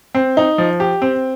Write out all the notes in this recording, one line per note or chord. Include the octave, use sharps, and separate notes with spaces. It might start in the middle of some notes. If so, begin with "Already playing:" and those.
C4
D#4
F3
G4
C4